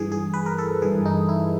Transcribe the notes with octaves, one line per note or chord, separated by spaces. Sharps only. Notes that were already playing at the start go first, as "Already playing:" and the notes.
Already playing: G2 E3 G#4
G#4
B4
A#4
A4
G2 E3 G#4
D#4
E4